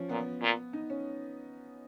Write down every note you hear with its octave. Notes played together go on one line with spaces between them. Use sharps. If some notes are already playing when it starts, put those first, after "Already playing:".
Already playing: F3 C#4
A#2 B3
A#2
D#4
C#4